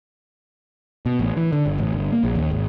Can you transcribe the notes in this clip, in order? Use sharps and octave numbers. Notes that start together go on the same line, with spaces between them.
B2
A1
E3
D3
G1
A1
G1
A#3
A#1
D#2
G#1